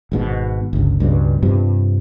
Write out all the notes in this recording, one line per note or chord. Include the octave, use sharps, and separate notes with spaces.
G#1 G#2 B2
G1 C#2
C#2 G2 B2
G2 C3 F3